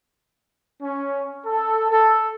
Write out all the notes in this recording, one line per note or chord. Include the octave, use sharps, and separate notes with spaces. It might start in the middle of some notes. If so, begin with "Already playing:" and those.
C#4
A4
A4